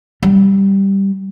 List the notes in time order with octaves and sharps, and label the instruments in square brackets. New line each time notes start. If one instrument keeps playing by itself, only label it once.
[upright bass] G3